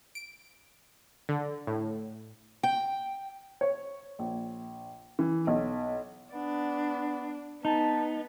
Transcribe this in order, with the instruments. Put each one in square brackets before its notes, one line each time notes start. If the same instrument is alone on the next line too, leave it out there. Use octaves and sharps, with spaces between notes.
[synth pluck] D7
D3
A2
[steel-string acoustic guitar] G5
[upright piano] C#5
A#1
E3
B1
[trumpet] B3 [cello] D4
[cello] B3 [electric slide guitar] D#4 [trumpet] A5